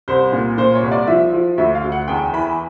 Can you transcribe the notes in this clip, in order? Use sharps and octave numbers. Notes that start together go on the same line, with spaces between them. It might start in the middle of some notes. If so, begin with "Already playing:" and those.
C2 C5
A#2
A#2 C5
C#5
C2
D5
F3 E5
F3
D2 E5
F5
D2
F#5
E2 G5
E3 B5